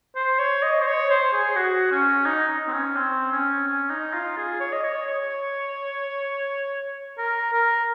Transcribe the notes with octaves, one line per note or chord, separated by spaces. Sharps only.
C5
C#5
D#5
C5
C#5
C5
G#4
F#4
C#4
D#4
C4
C#4
C4
C#4
C#4
D#4
F4
G#4
C#5
D#5
C#5
C#5
A#4
A#4